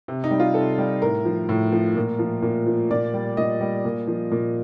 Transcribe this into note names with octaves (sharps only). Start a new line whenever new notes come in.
C3
D#4
G3
F4
C3 A4
G3
A2 A#4
F3
A2
F3
A#2
F3
A#2
F3
A#2 D5
G3
A#2 D#5
G3
A#2
F3
A#2